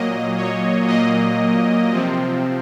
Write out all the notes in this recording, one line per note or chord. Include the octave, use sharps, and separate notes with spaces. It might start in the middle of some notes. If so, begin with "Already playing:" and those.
Already playing: A#2 F#3 A#3 D#5
C#5
A#2 F#3 A#3 D#5
C3 F3 C4